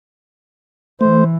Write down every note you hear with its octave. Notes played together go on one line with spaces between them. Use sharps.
E3 A3 C5